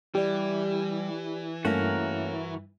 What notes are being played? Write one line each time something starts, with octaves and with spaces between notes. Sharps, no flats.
E3 G3 G4 D5
G2 A3 A#3 C#4 F#4 A#4